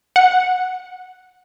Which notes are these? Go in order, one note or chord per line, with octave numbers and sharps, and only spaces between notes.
F#5